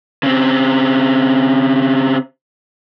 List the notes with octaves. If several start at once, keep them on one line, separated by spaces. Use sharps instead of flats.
C#3 C4